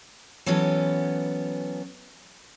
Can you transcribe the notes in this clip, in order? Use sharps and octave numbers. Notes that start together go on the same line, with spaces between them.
E3 F#3 B3 C#4 A4